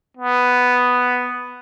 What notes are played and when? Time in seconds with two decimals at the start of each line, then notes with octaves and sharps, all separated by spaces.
0.17 B3